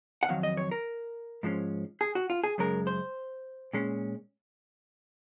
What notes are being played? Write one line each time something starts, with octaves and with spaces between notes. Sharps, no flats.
F#5
F2 D#3 F#3 F5
D#5
C#5
A#4
G#2 F3 G#3 C#4
G#4
F#4
F4
G#4
F#2 C#3 G#3 A#4
C5
A#2 G#3 C#4